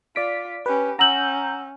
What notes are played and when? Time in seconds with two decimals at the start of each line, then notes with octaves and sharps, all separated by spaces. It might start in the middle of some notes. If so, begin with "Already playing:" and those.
0.16 F4 D5 B6 D7
0.66 C#4 G4 B4
0.99 C#4 F#5 A#5 E6 G6 F#7